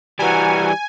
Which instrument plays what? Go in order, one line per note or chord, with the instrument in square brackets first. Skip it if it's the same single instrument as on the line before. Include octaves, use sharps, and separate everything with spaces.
[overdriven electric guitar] E3 G3 [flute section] F#4 A#5 [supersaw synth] G#5